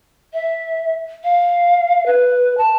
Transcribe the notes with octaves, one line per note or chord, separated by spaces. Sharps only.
E5
F5
B4
A5